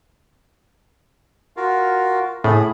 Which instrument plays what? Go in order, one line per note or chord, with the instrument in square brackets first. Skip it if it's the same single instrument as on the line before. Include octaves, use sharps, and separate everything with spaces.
[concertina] F4 F#4 A#4
[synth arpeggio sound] A2 [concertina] G#4 B5